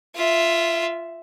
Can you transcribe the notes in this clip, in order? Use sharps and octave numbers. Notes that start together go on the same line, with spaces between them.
F4 E5